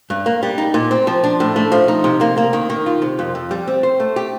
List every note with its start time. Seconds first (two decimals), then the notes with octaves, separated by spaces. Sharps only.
0.10 G2
0.26 A#3
0.43 G3
0.58 D#4
0.74 A#2
0.91 C4
1.07 F3
1.24 D4
1.40 A2
1.56 A3
1.72 F3
1.88 D#4
2.04 C3
2.21 A#3
2.38 A#3
2.53 D#3
2.70 D#3
2.86 F4
3.02 C3
3.19 F2
3.35 F2
3.51 G3
3.68 C4
3.83 C5
4.00 A3
4.16 G4